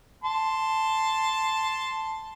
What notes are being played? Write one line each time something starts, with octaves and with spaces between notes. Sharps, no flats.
A5 C6